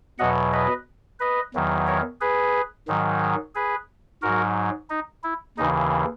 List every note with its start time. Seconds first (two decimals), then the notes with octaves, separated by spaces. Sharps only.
0.19 E2 B2 F#3 D#5 F#5
0.53 B4 D#5
1.20 B4 D#5
1.54 E2 D#3 F#3
1.87 A#4 C#5
2.21 G#4 B4
2.88 G#2 D#3 F#3
3.55 G#4 B4
4.22 G#2 F#3 F#4 A#4
4.90 D#4
5.24 E4
5.58 D#2 C#3 E3 D#4